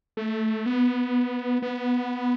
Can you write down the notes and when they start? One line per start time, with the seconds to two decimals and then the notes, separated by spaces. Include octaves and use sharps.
0.17 A3
0.66 B3
1.62 B3